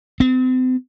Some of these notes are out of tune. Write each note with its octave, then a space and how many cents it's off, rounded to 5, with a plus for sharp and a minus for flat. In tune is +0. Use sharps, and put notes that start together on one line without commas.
C4 -40